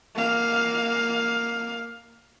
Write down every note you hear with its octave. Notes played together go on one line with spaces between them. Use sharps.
A#3 F5